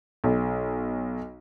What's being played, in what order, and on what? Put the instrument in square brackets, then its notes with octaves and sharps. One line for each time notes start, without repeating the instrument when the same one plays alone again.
[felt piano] B1